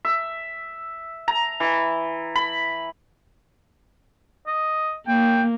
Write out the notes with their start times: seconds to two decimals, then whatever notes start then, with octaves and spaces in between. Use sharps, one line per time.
0.05 E5
1.28 A#5
1.60 E3
2.35 B5
4.47 D#5
5.07 A#3 G5